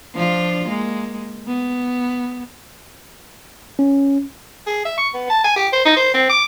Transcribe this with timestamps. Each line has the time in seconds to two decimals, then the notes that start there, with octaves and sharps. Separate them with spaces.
0.14 F3 D4 F4
0.68 G#3 A#3
1.48 B3
3.79 C#4
4.67 G#4
4.85 E5
4.98 C#6
5.14 B3
5.30 A5
5.44 G#5
5.56 G4
5.73 C5
5.85 D#4
5.96 C5
6.14 C4
6.29 D6